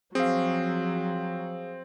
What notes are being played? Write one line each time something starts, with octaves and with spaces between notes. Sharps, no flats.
F3 F#3 C4 G#4 F5